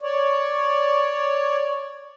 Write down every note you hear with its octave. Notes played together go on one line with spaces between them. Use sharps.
C#5 D5